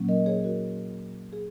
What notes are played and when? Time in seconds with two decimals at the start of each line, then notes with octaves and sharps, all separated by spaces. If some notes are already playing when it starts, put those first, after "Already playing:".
Already playing: A#2 F#3 A#3 C#4
0.09 A#4 D#5
0.26 G#4 C#5
0.44 F#4 A#4
1.33 G#4